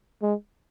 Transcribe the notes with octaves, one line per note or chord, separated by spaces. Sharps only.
G#3